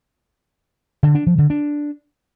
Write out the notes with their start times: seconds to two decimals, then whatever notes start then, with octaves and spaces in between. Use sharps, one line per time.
1.03 D3
1.15 D4
1.26 F3
1.38 D3
1.50 D4